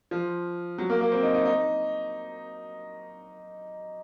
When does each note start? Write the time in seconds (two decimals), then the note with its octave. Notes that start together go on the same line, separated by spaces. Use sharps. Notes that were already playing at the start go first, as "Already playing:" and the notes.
0.11 F3
0.78 F#3
0.90 A#3
1.01 A#3
1.12 C4
1.23 D#4
1.34 D#4
1.45 D#4